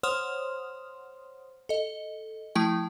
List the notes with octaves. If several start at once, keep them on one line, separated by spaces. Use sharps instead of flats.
C5 C#5 F#5 C6 D#6 F6
A4 D#5
F3 A3 E4 G5